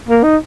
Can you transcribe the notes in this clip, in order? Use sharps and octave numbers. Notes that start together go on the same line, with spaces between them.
A#3
D#4